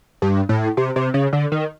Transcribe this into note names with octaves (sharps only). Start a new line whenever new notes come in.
G2
A2
C3
C3
C#3
D3
D#3